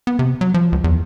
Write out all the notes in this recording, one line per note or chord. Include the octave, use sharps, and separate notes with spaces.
B3
C3
F#3
F3
C#2
E2